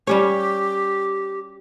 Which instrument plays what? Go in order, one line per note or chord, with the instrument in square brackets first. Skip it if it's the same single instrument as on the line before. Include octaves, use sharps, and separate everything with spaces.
[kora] G3 C#4 C#5 [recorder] G4